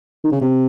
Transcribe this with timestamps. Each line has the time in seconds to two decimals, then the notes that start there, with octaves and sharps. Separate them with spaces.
0.24 D#3
0.32 C#3
0.41 C3